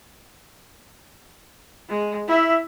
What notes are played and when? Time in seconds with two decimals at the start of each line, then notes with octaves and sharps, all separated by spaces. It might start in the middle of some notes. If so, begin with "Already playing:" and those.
1.89 G#3
2.27 E4 E5